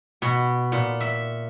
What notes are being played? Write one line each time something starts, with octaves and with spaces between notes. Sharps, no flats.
B2
A#2
E5